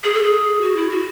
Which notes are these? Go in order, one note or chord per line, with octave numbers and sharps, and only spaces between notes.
G#4
A4
G#4
F#4
E4
F#4